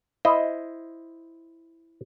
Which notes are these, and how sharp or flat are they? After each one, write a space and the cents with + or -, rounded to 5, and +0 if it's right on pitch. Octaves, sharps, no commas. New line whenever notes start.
E4 +0 C5 +0 D#5 +0